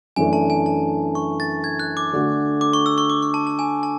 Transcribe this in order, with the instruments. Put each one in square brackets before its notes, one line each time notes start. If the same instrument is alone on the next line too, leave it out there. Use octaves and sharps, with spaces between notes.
[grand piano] F#2 E3 A3 D4 [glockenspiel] G#5
[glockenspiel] A5
G#5
A5
C#6
A6
G#6
F#6
D6
[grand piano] D3 A3 D4 F#4
[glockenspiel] D6
C#6
E6
C#6
D6
C#6
A5
A5
G#5
A5